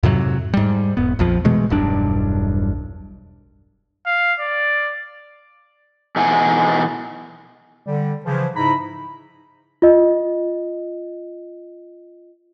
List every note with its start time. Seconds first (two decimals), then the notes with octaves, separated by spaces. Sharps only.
0.03 F2 G#2 C3 F#3
0.54 G#2 G3
0.97 E1 B3
1.19 A#1 F2 F3
1.45 B2 E3 G#3 A3
1.70 E1 B1 G2 D4
4.06 F5
4.40 D5
6.16 B2 E3 D#4 F#5 G#5
7.87 D3 G3
8.25 C#3 E3 F3
8.56 G#2 C#3 D#4 E4 A#5 B5
9.82 F4 D#5